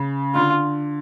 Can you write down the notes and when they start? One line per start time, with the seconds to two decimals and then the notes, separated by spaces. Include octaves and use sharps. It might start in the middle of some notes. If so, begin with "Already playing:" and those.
Already playing: C#3
0.35 D3 F4